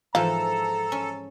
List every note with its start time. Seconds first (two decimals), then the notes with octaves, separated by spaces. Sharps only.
0.15 G#2 E3 F3 F4 A4 A#5
0.92 C#4